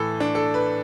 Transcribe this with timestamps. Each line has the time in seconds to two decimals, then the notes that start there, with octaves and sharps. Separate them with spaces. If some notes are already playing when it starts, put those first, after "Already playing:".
Already playing: A2 E3 A4
0.20 D4
0.35 A4
0.54 B4